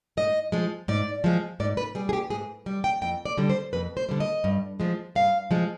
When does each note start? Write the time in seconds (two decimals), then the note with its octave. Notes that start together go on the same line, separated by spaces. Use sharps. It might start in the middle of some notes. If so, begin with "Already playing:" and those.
0.17 G#2 D#5
0.52 F3 G#3
0.88 G#2 D5
1.24 F3 G#3
1.60 G#2 D5
1.77 B4
1.95 G3 G#4
2.09 G#4
2.13 G4
2.30 G#2 G#4
2.66 G3
2.84 G5
3.02 F2 G5
3.25 D5
3.38 D3 G3
3.49 C5
3.73 F2 B4
3.97 C5
4.09 D3 G3
4.20 D#5
4.44 G2
4.80 F3 G#3
5.15 G2 F5
5.51 F3 G#3